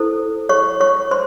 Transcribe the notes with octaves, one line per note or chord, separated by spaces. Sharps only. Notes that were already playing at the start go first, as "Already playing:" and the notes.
Already playing: E4 A4 C5
C#5 C#6
C#5 C#6
C5 C6